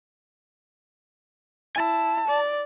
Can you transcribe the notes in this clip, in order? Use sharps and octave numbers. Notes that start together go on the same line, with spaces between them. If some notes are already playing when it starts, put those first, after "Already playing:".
E4 G#5 A5
D5